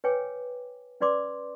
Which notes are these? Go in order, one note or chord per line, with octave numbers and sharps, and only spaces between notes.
B4 C#5 G5 G#5 D6
C#4 B4 D5 C6 D6